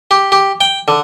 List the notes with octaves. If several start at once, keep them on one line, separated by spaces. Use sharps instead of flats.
G4
G4
G5
D3